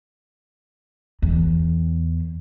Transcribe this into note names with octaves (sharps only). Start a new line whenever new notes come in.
E2